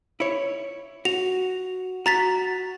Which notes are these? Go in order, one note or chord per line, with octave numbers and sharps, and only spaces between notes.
E4 C#5
F#4 F7
F#4 A#5 A6 B6